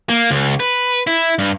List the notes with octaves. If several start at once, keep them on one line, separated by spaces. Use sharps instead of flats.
A#3
C#2
B4
E4
G2